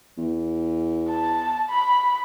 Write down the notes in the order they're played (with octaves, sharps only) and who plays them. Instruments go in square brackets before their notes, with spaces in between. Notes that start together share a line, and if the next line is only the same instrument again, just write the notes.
[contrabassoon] E2
[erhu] A5
B5